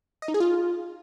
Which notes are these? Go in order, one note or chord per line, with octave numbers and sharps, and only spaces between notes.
D#5
D#4
G#4
F4